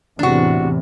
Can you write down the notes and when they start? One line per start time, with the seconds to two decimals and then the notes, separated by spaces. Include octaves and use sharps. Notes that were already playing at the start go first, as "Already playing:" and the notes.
0.19 E2 A2 C3 D4 F#4